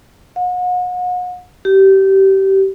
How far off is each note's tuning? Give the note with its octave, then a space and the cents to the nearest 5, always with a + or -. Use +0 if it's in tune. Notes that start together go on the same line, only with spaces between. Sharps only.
F#5 -40
G4 -25